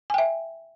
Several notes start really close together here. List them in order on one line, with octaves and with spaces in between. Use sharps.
G#5 G5 E5